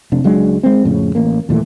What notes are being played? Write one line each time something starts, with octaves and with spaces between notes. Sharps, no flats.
F1 C3 D4
C#2 F#3 G#3 D4
G#3 C4
F2 A2 C#3
A1 A#3
D#2 A#2 E3 A3